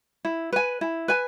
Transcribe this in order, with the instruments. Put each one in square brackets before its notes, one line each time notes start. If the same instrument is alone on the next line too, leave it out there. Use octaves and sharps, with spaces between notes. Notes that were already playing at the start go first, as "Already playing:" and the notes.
[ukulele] E4
B4 G#5
E4
B4 G#5